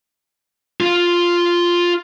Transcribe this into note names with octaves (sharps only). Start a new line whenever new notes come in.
F4 F5